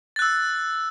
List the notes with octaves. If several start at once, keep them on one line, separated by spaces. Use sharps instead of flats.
E6 F#6 A6